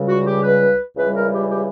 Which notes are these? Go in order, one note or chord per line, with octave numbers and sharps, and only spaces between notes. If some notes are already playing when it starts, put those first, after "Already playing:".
Already playing: C#2 C#3 G3
F#4
G4
B4
C#2 C#3 E3 G3 B4
A#4
G4
G4